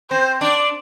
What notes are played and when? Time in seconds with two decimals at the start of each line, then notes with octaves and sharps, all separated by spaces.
0.10 C4 C5
0.41 D4 D5